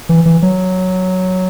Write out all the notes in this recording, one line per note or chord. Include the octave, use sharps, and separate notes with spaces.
E3
E3
F#3